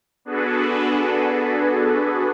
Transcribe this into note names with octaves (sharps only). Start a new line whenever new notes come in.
B3 D4 F#4 G#4 A4 B4